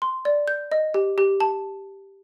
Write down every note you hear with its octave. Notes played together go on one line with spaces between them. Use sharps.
C6
D5
G6
D#5
G4
G4
A5